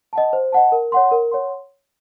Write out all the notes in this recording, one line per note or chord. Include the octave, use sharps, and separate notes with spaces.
D#5 F#5 A5
C5
D#5 F#5 A5
A#4
C#5 F#5 C6
A#4
C#5 F#5 C6